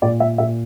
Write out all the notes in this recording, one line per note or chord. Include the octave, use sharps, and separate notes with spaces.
A#2 D5
E5
A#2 E5